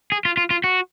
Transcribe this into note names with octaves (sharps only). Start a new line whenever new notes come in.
G#4
F4
F4
F4
F#4